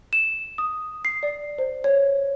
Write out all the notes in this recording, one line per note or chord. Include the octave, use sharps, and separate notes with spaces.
E7
D#6
C7
D5
C5
C#5